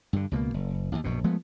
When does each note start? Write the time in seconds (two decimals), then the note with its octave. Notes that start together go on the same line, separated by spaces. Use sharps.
0.13 G2 D3
0.31 C#2 B2 G#3 A#3
0.54 F#1
0.92 A1 D#2
1.04 A#1 F#2 B2
1.24 F3 G#3 A3 B3